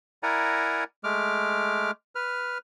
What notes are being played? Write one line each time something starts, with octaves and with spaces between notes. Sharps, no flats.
E4 A#4 D5 F#5 G#5 A#5
G#3 A3 D6 F6
B4 F6